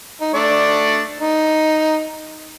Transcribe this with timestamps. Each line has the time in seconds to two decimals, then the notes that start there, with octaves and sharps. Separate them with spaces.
0.21 D#4
0.34 A3 D4 D5
1.20 D#4